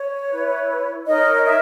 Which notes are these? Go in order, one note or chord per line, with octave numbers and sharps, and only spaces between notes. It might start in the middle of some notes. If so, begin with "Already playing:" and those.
Already playing: C#5
E4 B4
D#4 A#4 C#5 D#5
E5